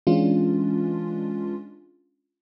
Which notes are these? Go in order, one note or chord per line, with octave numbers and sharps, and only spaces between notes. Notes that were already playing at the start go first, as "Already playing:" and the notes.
E3 G#3 C#4 D4 F4